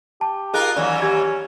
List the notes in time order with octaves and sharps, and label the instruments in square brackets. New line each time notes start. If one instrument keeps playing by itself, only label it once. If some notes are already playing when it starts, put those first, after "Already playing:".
[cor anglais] G4 [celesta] A5
[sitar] D#4 F4 A#4 [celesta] G#4 F#6
[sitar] D#2 E3 F#3 [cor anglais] C#4 [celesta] D5
[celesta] G4 G#6